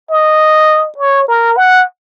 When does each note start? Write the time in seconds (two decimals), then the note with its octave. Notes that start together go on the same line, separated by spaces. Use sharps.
0.10 D#5
0.98 C#5
1.28 A#4
1.57 F#5